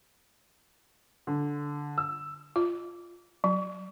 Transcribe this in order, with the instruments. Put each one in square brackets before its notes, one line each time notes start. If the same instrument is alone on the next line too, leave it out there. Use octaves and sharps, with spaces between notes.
[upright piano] D3
E6
[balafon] F4
F#3